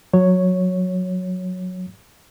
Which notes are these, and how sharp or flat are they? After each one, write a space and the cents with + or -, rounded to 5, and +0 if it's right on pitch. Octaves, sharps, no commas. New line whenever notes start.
F#3 -20 C#5 +0